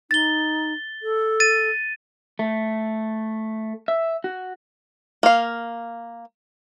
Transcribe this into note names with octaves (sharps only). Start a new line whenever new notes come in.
D#4 A6 G7
A4
A6 D#7
A3
E5
F#4
A#3 F5